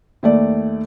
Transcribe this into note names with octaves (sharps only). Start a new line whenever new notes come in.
D#2 A3 D5